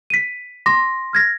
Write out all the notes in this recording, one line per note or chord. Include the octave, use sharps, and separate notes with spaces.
B6 D#7
C6 D6 A#6
F6 G#6 A#6